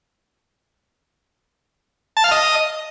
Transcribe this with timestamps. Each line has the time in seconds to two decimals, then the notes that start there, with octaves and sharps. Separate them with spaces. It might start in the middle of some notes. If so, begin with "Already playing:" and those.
2.17 A5
2.24 F5
2.31 D#5